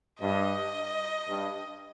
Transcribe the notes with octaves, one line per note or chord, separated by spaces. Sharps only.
G2 D#5
G2